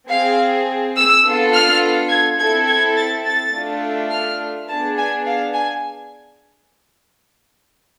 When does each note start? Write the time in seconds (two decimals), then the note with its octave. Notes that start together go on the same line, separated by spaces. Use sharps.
0.10 C4 G#4 F5
0.97 E6
1.25 B3 D4 F4 A4
1.54 F6
2.10 G#6
2.39 C4 E4 A4 G#6
2.68 G#6
2.97 A6
3.25 A6
3.54 A3 D4 F4 A4
4.11 F6
4.69 B3 D4 G#4 A5
4.98 G#5
5.27 F5
5.54 G#5